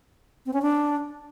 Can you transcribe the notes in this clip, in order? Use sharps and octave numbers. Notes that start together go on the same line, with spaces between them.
C4
C#4
D4